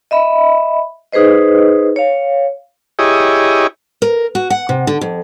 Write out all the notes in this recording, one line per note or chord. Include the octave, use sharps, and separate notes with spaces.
D#5 E5 B5
D#4 G#4 B4 C5 D#5
C#5 F5
E4 G4 G#4 C#5 D#5
A#4
F#4
F#5
C3
D3
F2